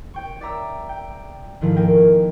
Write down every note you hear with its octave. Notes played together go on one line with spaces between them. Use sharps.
C#5 G5 C#6
D5 E5 A#5 E6
G5
G#2 D#3 F3 A3 E4
A#3 A#4 G5 G#5